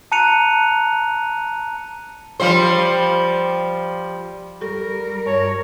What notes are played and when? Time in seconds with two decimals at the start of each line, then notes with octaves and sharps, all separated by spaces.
0.12 A5 A#5 F#6 C#7 D#7 F7
2.40 F3 G3 C5
4.61 G3 G4 A4 A#4 C#6
5.26 G2 C#5